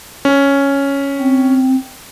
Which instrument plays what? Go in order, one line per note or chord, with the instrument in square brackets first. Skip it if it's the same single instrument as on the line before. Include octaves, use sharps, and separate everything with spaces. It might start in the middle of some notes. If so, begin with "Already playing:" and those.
[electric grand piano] C#4
[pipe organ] C4